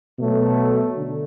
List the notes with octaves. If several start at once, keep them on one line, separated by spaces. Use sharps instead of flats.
B2 F#3 A3
D3